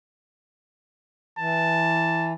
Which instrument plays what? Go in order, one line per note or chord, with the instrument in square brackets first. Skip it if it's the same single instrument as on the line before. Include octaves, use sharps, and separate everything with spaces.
[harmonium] E3 [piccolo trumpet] A5